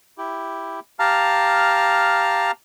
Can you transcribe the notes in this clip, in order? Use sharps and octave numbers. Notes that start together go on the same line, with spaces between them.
E4 G4
G4 F5 A5 A#5 F6